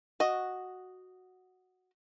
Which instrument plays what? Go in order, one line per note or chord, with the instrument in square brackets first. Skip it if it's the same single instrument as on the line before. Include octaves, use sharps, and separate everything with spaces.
[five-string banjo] F#4 D#5